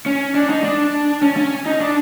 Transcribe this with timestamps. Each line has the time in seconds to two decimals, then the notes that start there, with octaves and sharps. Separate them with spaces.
0.06 C#4
0.35 D4
0.50 D#4
0.64 D4
1.22 C#4
1.37 C#4
1.66 D#4
1.81 D4